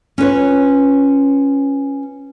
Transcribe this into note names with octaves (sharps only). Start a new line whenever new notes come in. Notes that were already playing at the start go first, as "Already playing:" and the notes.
C#4 F4 B4 C#5